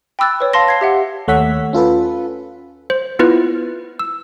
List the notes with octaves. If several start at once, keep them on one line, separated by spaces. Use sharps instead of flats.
G5 B5 D6 E6 F#6 A6
B4 C#5
F5 A5 C6 A#6
G#6 C7
G4 E5 F#5
D#2 A3 C#5 F#5 E6 B6
C#4 F4 A4 B4
C5
B3 E4 F4 B4 F6
E6